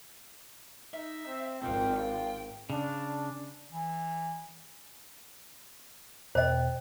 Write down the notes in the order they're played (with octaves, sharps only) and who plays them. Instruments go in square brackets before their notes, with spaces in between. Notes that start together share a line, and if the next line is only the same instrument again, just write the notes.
[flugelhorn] D#4 [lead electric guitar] E5
[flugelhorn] C4
[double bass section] G#1 [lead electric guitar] C4 F4 [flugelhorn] G5
[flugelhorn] F4 [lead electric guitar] G5
[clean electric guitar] C#3 [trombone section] D4
[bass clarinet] E3
[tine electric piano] E2 B2 G5 [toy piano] C5 D#5